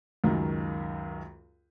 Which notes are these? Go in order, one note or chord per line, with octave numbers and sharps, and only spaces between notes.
C#2 F#2 D#3